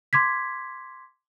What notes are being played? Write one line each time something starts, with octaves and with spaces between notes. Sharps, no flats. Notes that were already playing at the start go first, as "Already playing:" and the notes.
C6 D6 G#6 B6